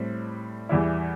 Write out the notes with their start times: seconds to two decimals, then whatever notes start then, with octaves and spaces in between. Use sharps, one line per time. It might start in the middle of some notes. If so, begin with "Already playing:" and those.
Already playing: A2 G3 C4
0.69 E2 E3 G3 E4